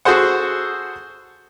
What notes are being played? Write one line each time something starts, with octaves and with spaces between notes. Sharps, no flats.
F#4 G#4 A4 C5 F#5